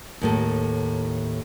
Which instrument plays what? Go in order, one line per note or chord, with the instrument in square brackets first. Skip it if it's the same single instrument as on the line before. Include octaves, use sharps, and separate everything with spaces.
[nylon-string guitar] D#2 A2 A4